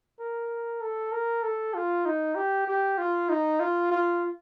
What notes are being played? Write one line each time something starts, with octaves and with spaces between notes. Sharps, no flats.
A#4
A4
A#4
A4
F4
D#4
G4
G4
F4
D#4
F4
F4